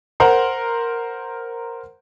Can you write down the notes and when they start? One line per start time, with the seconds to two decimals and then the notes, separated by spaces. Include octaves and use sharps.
0.20 A#4 C5 F#5 A#5 C6